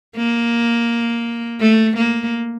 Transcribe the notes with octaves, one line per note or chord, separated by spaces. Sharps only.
A#3
A3
A#3